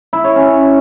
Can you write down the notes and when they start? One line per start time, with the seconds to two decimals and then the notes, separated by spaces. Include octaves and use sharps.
0.13 E4
0.24 C#5
0.36 C#4